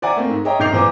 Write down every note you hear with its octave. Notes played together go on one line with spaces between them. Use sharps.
C5 D5 E5 F#5 G#5 A#5
A3 A#3 C4
G#2
G#4 C#5 D#5 E5 G5 A#5
A#1 D#3 A#4 G6 C7 F7
A#1 A#2 E3 C5 A#5 D6